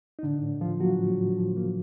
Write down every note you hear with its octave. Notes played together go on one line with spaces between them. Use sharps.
D#4
A2 D3 D4
A2
F3 F4
F#3 A#3 F#4
A2
A2
F3
A#3